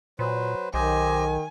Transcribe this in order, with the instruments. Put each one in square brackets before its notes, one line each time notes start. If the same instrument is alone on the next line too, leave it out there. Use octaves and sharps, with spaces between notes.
[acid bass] A#2 [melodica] F#3 B4 C5
[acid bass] B1 [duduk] D#3 [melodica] G4 C5 D#5 [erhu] G#5